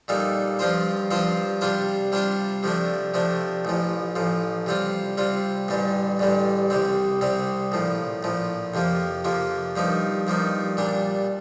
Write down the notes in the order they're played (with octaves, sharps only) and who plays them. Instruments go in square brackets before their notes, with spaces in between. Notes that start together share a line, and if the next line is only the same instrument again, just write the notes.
[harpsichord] A#2 G3 A#3 D#4 A4
G2 F3 C4 F4 C5
G2 F3 C4 F4 C5
C3 G3 D4 F4 C5
C3 G3 D4 F4 C5
C3 F3 A3 D4
C3 F3 A3 D4
A1 A2 F3
A1 A2 F3
C3 G3 C4 F4
C3 G3 C4 F4
A1 G2 D3 G3
A1 G2 D3 G3
C2 C3 G3 C4
C2 C3 G3 C4
A#1 A2 F3
A#1 A2 F3
F2 C3 F3 A#3
F2 C3 F3 A#3
G2 F3 A#3 D#4
G2 F3 A#3 D#4
A#2 G3 D4